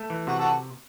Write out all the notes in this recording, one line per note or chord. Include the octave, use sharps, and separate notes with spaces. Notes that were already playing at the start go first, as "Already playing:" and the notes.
Already playing: A3
E3
C3 F#4
F#4 A4